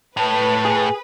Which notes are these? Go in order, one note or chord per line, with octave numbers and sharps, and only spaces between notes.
A2 B4 A5
G#4